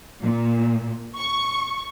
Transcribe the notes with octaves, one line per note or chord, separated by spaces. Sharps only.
A#2
C#6